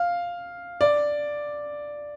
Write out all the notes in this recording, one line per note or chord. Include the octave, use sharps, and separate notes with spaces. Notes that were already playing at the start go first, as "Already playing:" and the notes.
Already playing: F5
D5